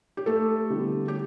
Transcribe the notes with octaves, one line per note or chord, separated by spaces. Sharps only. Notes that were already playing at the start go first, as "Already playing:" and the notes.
G4
A3 A4
D3 G3 B3 E4 G4
G4